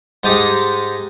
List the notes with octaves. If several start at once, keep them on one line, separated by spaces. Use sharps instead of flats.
G#2 G#3 D#4 G4 A5 D#6